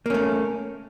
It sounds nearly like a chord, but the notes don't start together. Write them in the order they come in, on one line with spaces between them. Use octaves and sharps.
A#3 C#4 A3